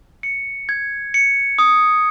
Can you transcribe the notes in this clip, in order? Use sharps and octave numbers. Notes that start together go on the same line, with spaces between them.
C#7
G#6
C#7
D#6